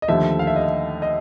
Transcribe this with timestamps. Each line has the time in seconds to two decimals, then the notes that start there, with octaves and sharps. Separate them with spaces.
0.02 D#5
0.08 D#2 D3 F3 A3 E5
0.39 F5
0.47 E5
0.56 D#5
0.64 E5
1.02 D#5